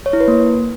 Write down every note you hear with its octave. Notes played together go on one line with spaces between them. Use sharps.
C#5
E4
B4
A#3